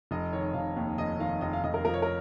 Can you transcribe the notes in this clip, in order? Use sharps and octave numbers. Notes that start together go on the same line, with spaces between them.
F1 D#5
D#3 C#5
F1 F5
D#2
F1 D#5
D#3 F5
F1 D#5
F5
F1 D#5
A#4
F3 A#4
C#5
A#4